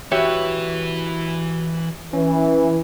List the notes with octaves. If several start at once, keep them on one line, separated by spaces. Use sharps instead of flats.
E3 F#4 G4 B4 C#5 E5
E3 C#4